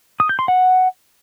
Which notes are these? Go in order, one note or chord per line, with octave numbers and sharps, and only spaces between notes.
D#6
G6
C6
F#5